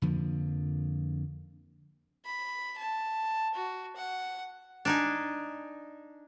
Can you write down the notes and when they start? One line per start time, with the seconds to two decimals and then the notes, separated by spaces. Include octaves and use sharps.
0.02 F2 D3 F3 A#3
2.25 B5
2.78 A5
3.55 F#4
3.96 F#5
4.85 D4 D#4 G#5